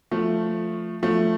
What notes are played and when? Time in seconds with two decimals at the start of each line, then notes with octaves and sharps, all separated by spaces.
0.12 F3 A3
1.02 F3 A3